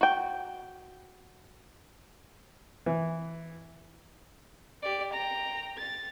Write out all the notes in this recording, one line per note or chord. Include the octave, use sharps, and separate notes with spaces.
F#4 G5
E3
G4 D5
G5 A#5
A6